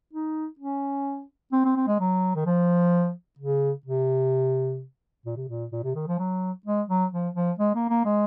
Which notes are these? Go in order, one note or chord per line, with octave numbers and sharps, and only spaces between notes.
D#4
C#4
C4
C4
C4
G#3
F#3
D#3
F3
C#3
C3
A#2
C3
A#2
A#2
C3
D#3
F3
F#3
G#3
F#3
F3
F3
G#3
A#3
A#3
G#3